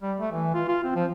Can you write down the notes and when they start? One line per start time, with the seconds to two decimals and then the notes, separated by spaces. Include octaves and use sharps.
0.02 G3
0.20 A3
0.32 E3
0.54 F4
0.68 F4
0.84 C4
0.95 F3